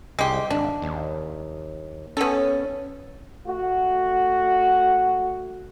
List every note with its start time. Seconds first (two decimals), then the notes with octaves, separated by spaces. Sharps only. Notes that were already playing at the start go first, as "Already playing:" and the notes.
0.19 C2 G#3 G4
0.50 G#1 D4
0.82 D#2
2.17 B3 C#4 A4
3.46 A3 F#4